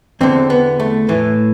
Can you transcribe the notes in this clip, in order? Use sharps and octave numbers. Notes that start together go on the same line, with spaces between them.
E2 D3 C4
B3
A3
A2 E3